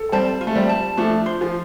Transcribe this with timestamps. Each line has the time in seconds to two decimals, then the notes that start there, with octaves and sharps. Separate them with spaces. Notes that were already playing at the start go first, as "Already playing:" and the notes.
Already playing: A4
0.12 G3 C4 A5
0.41 F4
0.47 A3
0.55 G3 C4
0.69 A5
0.97 F3 A3 D4
1.26 C5
1.41 F3